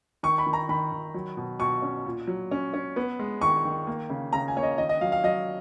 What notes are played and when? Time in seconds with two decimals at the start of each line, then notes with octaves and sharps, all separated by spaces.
0.23 D#3 C#6
0.38 B5
0.47 D#3
0.53 A#5
0.69 D#3 B5
0.92 D#3
1.14 F#3
1.37 B2
1.60 B2 C#6
1.82 C#4
2.06 A#2
2.27 F#3
2.51 C#4
2.74 C#4
2.96 B3
3.19 G#3
3.41 D#3 C#6
3.65 D#3
3.87 A#3
4.10 C#3
4.33 C#3 A#5
4.48 G#5
4.56 A#3 C#5
4.63 D#5
4.78 D#3 D#5
4.89 D#5
5.01 F#3 F5
5.12 F5
5.24 F#3 D#5